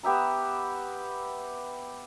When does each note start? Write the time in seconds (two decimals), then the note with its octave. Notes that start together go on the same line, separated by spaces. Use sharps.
0.03 B3 G4 E5 A#5